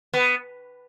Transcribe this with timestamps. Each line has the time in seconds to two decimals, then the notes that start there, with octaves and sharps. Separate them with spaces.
0.14 B3